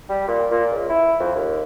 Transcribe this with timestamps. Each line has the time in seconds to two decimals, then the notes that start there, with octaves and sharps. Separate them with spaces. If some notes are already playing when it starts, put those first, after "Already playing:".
0.09 G3
0.28 A#2
0.51 A#2
0.71 C#2
0.90 E4
1.20 F2
1.35 D#2